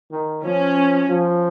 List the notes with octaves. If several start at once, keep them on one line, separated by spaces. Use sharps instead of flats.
D#3
F3 C#4
F3